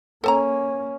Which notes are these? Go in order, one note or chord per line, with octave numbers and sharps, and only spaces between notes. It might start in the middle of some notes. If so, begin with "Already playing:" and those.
A#3 C#4 A4 A5 A#5